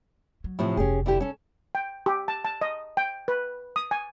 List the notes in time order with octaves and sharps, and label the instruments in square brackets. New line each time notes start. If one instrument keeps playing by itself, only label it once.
[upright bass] F#3
[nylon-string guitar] A2 C3 F3
[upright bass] F1 [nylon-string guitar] C#4 G4 G#4
[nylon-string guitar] D3 E4 G4
C#4 A4
[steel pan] G5
G4
A5
A5
D#5
G5
B4
D#6
G#5